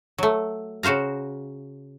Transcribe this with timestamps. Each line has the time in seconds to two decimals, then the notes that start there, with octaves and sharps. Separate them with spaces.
0.18 F#3 A3
0.83 C#3 F#4 C5 F5 A#5